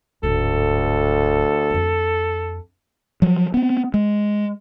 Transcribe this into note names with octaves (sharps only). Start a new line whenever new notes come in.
D1 D2 G#2 A4
F2 D4
F3 F#3
B3 C4
G#3